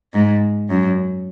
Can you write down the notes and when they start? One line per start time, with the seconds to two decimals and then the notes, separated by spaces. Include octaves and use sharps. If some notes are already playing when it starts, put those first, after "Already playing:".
0.14 G#2
0.69 F#2